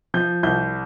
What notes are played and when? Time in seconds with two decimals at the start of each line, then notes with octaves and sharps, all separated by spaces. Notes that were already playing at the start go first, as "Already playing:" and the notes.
0.14 F3 G6
0.43 C2 G6